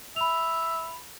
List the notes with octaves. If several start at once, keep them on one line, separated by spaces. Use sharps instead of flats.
E5 B5 F7